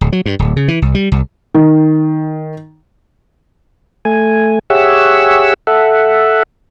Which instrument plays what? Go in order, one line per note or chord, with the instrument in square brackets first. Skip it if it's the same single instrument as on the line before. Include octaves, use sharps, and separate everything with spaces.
[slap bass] D1
F#3
G2
D1
C#3
E3
C2
G3
C2
[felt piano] D#3
[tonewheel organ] A3 G#5
G4 G#4 C#5 E5 F#5 E6
A4 E5 F#5